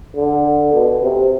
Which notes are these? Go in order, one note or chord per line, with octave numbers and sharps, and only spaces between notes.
D3
B2
C3